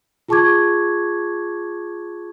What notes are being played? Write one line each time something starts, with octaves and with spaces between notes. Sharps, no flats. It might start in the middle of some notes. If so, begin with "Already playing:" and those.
F4 G#4 A5 C#6 D6 G#6